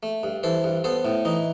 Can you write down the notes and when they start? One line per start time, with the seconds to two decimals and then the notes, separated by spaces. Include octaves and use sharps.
0.03 A3
0.23 G2
0.43 E3 A4 C5
0.64 G2
0.84 B3 A4 C5
1.05 A2
1.25 E3 D#4